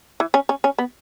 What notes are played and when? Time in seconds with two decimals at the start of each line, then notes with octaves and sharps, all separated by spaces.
0.20 E3
0.34 C#4
0.49 C#4
0.64 C#4
0.78 B3